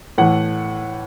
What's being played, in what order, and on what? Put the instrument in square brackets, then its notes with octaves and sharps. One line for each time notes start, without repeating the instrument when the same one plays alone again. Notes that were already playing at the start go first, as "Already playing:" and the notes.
[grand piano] A2 E3 F#5